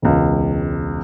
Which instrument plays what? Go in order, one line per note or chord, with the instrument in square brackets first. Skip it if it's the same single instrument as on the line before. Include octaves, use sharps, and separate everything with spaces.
[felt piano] E1 C#2